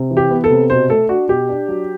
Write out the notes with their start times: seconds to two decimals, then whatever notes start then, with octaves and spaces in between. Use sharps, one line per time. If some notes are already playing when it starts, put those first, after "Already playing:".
Already playing: C3
0.11 E3
0.17 G4
0.31 B3
0.44 A4
0.50 C3
0.70 B2 C5
0.90 A3 A4
1.09 D4 F#4
1.29 B2 G4
1.49 D4
1.68 F#3